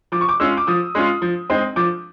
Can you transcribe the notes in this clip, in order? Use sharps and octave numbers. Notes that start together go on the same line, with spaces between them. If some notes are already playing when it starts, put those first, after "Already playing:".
F3 D6
C#6
D6
G#3 C#4 F4 E6
D6
F3 D#6
G#3 C#4 F4
F3
G#3 C4 D#4
F3 D6